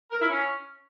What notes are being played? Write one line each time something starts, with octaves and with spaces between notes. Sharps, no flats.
A#4
E4
C#4